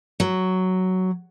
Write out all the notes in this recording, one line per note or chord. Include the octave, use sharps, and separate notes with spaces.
F#3